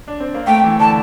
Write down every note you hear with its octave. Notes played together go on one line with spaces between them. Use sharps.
D4
C4
A#3
A3 G5
E3
D3 A5